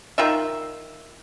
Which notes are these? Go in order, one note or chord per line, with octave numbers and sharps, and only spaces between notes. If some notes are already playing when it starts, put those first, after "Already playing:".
D#3 F4 E5